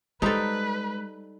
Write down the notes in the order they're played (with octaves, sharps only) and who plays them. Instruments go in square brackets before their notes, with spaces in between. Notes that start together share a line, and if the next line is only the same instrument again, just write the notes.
[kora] G3 D#4 C5 [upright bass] G#3 [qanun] A4 A#5 [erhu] B4